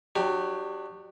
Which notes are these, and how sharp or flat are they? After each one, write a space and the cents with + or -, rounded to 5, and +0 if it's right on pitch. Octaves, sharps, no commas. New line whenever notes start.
F#3 +0 D4 +30 G4 +0